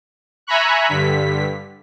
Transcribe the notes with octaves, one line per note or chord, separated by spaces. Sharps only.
E5 G#5 A#5 B5 C#6 F#6
G2 D3 B6